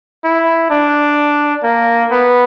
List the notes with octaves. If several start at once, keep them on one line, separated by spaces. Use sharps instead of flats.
E4
D4
A#3
B3